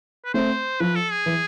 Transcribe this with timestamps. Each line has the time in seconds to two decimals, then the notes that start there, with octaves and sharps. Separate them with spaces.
0.25 B4
0.34 A3 C4 C5
0.80 F3 B4
0.95 A4
1.11 G#4
1.26 E3